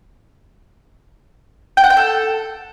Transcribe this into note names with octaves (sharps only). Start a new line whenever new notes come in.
G5
F#5
G5
A4